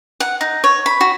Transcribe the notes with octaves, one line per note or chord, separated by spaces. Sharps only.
F#5
D#4
C#5
B5
F#4